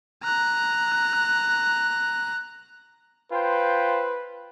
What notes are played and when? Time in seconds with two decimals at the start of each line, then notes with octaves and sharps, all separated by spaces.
0.23 A#5 F#6
3.32 F4 B4 C5 G5